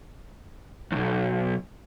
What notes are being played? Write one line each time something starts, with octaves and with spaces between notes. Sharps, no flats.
B1 E2